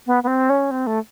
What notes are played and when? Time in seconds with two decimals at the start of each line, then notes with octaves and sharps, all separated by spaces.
0.06 B3
0.23 B3
0.27 C4
0.50 C#4
0.71 C4
0.87 A3